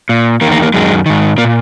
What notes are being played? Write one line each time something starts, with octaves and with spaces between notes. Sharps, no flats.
A#2
E2 D#3 A#3
A#3
A#3
F#2 D#3 G#3
G#2 D#3
A#2 A#3